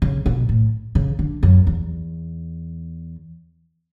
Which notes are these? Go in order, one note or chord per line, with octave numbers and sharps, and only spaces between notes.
C#3
B2
A2
C#3
D3
F#2
E2